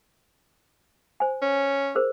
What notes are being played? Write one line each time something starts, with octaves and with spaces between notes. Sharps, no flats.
C5 G#5
C#4
G#4 A#4 C5